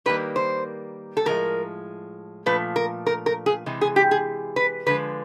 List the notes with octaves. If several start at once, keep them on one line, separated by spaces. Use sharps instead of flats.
D#3 G3 A#3 B4
C5
A4
A2 F3 G#3 A#4
A#2 F3 A3 B4
A#4
A#4
A#4
G#4
C3 E3 G#3
G#4
G4
G#4
B4
D3 F3 G#3 B4